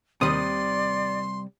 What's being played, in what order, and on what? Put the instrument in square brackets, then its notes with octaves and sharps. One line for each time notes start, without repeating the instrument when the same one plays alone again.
[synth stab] D#2 D#3 D#6 [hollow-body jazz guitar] C3 G3 [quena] D5 [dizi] C6